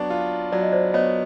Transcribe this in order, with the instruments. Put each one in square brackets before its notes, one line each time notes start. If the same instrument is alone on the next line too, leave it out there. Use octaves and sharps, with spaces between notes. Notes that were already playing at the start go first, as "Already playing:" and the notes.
Already playing: [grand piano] F#3 B3 D4
F4
[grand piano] F#3 [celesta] D5
[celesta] D#5
C5 D5
[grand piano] B3 [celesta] C#5 D#5